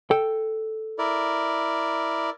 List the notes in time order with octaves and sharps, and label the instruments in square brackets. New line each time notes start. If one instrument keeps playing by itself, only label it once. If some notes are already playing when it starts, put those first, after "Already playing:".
[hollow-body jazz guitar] A4 G5
[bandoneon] E4 A#4 D5